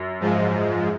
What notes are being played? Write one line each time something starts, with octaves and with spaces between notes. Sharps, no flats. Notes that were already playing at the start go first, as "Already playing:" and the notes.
Already playing: F#2
G#2 F3 G#3